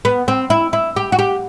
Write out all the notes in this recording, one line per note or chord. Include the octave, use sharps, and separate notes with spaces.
B3
C4
E4
E4
G4
F#4
G4